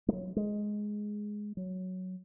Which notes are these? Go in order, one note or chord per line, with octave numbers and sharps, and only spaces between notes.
F#3 G#3
G#3
F#3